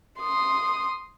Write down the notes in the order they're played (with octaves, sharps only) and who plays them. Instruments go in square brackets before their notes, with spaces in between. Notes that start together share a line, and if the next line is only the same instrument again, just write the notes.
[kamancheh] C6 D#6